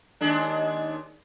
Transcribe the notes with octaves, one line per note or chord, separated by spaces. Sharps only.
D#2 G#3 D4